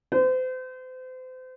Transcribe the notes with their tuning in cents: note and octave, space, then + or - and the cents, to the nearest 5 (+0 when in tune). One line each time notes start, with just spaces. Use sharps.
C5 -35